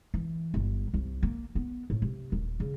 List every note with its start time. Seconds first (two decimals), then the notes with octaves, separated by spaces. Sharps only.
0.14 E3
0.54 G1
0.94 C2
1.23 A#3
1.55 B3
1.90 A2
2.02 C3
2.32 D#1
2.60 C#3